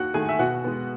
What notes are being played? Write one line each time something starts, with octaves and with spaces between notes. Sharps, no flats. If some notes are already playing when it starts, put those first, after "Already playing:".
Already playing: D#2 F#4 F#5
D#3 A3 G#4 G#5
E5
B2 F#4 F#5
G#3 B3